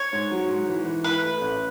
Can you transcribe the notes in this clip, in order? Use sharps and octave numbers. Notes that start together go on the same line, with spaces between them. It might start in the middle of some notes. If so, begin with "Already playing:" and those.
Already playing: C#5
G#2
F#3
G#2
E3
E3
E4 B4
A3
A1